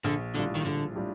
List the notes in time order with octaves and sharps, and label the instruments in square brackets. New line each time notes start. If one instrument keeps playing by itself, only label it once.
[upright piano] A#1 [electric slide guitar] D3
[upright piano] A2 G3 D4 F4 [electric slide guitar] D3
[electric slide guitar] D#3
[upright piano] A#1 [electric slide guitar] D3
[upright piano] A2 G3 D4 F4